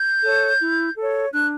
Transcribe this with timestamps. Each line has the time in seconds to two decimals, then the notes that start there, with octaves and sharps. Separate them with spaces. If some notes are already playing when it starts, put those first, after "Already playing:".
Already playing: G6
0.22 A4 C#5
0.60 E4
0.96 A4 C#5
1.33 D4 F#6